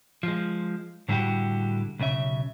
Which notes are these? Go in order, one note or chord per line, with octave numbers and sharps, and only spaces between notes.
F3 G#3
A2 D3 G3 E4 F#4 G4
B1 C#3 E5